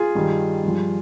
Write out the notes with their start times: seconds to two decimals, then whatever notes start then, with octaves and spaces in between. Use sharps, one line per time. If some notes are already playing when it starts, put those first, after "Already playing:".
Already playing: F4 G#4
0.15 G2 D#3 G3
0.63 G2 F3